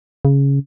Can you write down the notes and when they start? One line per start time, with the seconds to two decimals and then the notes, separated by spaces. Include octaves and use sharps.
0.25 C#3